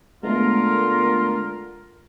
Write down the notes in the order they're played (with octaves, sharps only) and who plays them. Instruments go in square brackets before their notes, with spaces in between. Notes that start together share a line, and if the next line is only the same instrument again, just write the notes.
[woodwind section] D3 F4 A#4 [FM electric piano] G#3 A3 B3